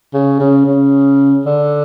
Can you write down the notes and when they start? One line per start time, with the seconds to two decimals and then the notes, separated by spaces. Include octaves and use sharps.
0.13 C#3
0.40 C#3
0.66 C#3
1.45 D3